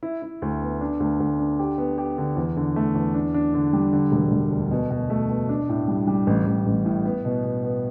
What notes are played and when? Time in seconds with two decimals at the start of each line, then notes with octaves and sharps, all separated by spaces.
0.03 E4
0.22 E4
0.42 D2
0.61 B3
0.81 D4
1.00 D2
1.20 D2
1.39 D4
1.59 G4
1.78 B3
1.98 G4
2.18 D3
2.36 E2
2.57 D3
2.76 A3
2.95 E2
3.14 D4
3.34 D4
3.54 D3
3.73 G3
3.93 D3
4.12 E1
4.32 E1
4.51 D2
4.71 B2
4.90 B2
5.10 A3
5.29 B2
5.49 D4
5.69 A2
5.88 G3
6.07 G3
6.27 A1
6.46 A1
6.66 A1
6.85 A2
7.05 B3
7.25 B2
7.44 B2
7.64 B3